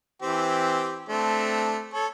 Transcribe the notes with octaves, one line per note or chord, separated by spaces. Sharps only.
E3 C4 G4
A3 C4 D4
A4 C#5